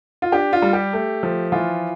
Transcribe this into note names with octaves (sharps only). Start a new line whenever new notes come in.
F4
D4 G4
F4
G3
G4
A3
F3
E3 F4